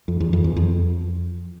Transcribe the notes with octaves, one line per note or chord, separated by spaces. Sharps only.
F2
E2
F2
E2
F2